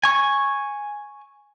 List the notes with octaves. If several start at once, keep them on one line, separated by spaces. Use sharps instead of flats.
G#5 C#6